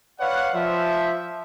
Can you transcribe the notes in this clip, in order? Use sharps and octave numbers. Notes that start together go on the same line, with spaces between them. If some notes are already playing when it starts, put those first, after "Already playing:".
B4 C#5 D5 F5 F#5
F3 E5